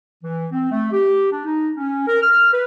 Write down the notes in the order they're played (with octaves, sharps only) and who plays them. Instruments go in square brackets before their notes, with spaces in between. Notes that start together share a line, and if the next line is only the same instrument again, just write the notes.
[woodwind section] E3
C4
A3
G4
D4
D#4
C#4
A#4
F6
B4